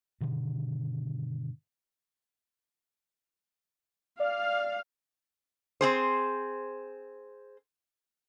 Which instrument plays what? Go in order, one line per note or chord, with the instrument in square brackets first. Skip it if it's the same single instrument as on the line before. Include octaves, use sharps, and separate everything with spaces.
[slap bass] G2 B2 D3 D#3
[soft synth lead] D5 [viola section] F5
[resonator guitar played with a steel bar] C4 G#4 C5